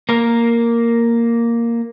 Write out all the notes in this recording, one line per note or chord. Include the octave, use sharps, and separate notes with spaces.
A#3 A#4